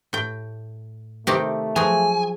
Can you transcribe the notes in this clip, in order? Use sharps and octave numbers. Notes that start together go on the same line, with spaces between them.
A2 G5
C3 D#3 A3 C4 G4
F3 F#3 G#4 G#5